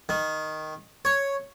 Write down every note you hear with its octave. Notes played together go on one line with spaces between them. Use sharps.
D#3
C#5